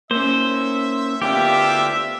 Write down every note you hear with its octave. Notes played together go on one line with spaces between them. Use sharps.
A#3 C#4 C5 E5
D2 B3 D4 F4 G4 E5 G5 D6